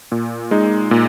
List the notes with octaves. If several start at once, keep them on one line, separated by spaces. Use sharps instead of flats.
A#2
G#3 D#4
A#2